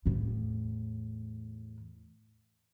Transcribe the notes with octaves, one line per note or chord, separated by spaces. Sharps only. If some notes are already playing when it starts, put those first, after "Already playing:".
E2 A2